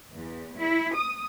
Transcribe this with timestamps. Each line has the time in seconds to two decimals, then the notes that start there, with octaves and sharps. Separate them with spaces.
0.12 E2
0.56 E4
0.94 D#6